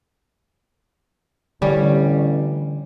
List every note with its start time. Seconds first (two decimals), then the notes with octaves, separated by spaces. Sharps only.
1.62 A1 D3 G3 C#4